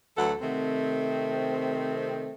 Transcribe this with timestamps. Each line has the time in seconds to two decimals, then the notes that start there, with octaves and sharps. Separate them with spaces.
0.18 D2 E3 F#3 A4 F#5
0.42 C3 D#3 A3 C4